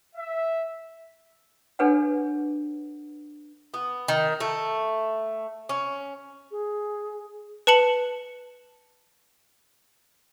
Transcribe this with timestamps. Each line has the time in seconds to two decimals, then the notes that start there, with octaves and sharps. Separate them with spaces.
0.15 E5
1.79 D4 G#4 A4 B4 C#5 F#5
3.74 B3
4.08 D#3
4.40 A3
5.69 C#4
6.51 G#4
7.67 B4 A5 C#7 F#7